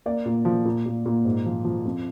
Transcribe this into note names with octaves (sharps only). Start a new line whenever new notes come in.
A#3 D5
A#2
F3
A#2
A#2
A#2
G#2
F3
F3
F2